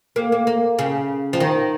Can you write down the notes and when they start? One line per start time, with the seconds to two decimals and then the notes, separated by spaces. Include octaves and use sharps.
0.16 A#3
0.32 A#3
0.47 A#3
0.79 C#3
1.33 F3
1.40 D#3